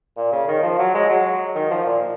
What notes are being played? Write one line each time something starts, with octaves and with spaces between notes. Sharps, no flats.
A#2
C#3
D#3
F3
F#3
G#3
F#3
D#3
F3
A#2